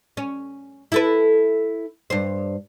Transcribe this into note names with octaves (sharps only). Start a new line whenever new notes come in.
C#4
E4 A4 B4
G2 C5